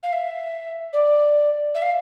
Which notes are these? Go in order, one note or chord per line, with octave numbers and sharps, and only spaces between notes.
F5
E5
D5
E5
F5